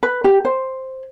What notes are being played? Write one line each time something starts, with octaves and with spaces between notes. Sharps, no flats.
B4
G4
C5